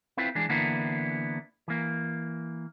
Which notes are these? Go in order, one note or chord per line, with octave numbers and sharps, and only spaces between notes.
C4 E4 F4 B4
E3 G#3 D4
D3 E3 A#3 B3 D4 E4
E3 A#3